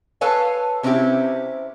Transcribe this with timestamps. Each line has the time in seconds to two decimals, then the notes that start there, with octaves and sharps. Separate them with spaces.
0.21 A4 B4 C#5 F5 G#5
0.83 C3 C4 C#4 D#4 E4 G4